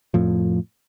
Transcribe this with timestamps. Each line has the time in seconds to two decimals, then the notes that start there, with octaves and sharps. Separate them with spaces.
0.14 F2 A2 F3